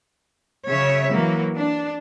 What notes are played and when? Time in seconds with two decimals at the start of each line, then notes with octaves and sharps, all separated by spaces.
0.68 F#2 C#3 C#5 E5
1.13 E3 F#3 A#3
1.57 D4